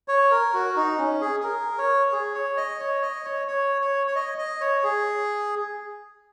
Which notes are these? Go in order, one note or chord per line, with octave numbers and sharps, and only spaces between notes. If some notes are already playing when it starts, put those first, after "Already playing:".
C#5
A#4
F#4
D#4
C#4
G#4
G#4
A#4
C#5
G#4
C#5
D#5
C#5
D#5
C#5
C#5
C#5
C#5
D#5
D#5
C#5
G#4